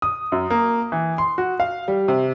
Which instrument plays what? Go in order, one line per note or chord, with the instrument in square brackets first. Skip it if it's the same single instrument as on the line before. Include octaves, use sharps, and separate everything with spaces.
[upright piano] D#6
F#2
A#3
E3
C6
F#4
F5
G3
C3